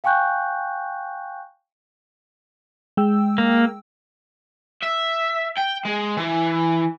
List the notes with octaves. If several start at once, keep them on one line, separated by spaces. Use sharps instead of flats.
F5 G5 G#5 C#6 F#6 G6
G#3 G5 E6
A#3
E5
G5
G#3
E3